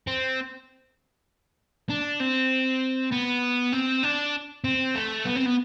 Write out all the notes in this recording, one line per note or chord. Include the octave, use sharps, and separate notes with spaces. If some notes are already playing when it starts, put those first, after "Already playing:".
C4
D4
C4
B3
C4
D4
C4
A3
B3
C4
B3